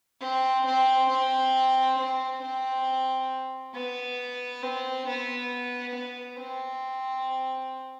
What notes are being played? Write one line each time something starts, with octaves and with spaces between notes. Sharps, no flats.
C4
C4
C4
C4
C4
B3
C4
B3
B3
C4